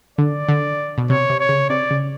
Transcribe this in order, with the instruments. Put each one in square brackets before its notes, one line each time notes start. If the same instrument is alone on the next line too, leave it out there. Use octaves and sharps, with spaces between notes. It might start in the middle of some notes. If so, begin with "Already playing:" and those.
[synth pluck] D3 [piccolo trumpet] D5
[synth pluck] D3
B2
[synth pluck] C3 [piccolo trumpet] C#5
[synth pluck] C3
[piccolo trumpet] C#5
[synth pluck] C#3
[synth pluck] C3 [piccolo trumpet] D5
[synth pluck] C#3